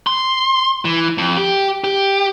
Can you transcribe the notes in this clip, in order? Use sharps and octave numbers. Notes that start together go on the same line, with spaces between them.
C6
E3
F2
G4
G4